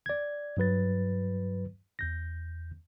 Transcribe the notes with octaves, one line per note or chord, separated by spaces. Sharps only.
D5 G#6
G2 F#3 B4 A6
E2 G6 A#6